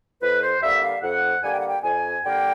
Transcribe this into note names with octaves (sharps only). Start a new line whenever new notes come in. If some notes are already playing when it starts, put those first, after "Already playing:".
F2 B4
C5
D3 G3 A#3 E5
F5
F2 F#5
D3 G3 A#3 G#5
G5
F#5
G5
F2 G#5
D3 G3 A#3 G5